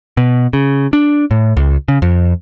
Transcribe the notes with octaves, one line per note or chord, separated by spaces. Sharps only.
B2
C#3
D4
A2
C#2
C#3
F2